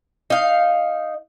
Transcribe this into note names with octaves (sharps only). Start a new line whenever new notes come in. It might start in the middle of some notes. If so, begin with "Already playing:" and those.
D#4 F5